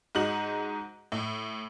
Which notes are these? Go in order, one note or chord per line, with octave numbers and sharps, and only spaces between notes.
G#2 D#4 F#4 F#7
A2